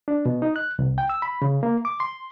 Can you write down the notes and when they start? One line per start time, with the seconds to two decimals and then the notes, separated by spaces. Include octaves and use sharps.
0.08 D4
0.26 B2
0.42 D#4
0.56 F#6
0.79 C2
0.98 G5
1.09 E6
1.22 B5
1.42 C#3
1.63 A#3
1.85 D6
2.00 C6